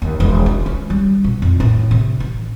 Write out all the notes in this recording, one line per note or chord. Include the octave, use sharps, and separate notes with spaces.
D#2
E1
D4
C#4
G3
B2
F2
A2
C3
A1